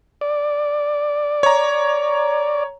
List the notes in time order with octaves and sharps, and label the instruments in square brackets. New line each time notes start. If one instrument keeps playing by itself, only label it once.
[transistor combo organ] D5
[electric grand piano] C#5 A#5